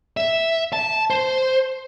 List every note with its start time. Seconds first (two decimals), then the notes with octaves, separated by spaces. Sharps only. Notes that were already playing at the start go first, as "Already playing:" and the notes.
0.17 E5
0.73 A5
1.10 C5